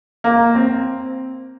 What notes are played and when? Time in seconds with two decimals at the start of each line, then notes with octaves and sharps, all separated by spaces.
0.24 A#3
0.55 C4